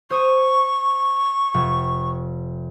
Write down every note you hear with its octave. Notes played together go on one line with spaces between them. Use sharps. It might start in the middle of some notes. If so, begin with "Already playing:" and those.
C5 C#6 D#6
F1